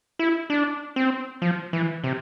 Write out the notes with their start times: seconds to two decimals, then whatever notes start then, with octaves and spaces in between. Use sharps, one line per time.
0.19 E4
0.50 D4
0.96 C4
1.42 F3
1.73 E3
2.04 C3